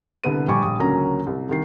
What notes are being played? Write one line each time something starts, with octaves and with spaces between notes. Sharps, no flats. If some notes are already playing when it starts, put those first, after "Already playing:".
C2 D3 B3 D#7
A#1 G3 G#5 C#6 D6
A#1 G3 D#6
C#2 D3 F#3 A#3 C#4 A#5
C2
C2 D#3 C7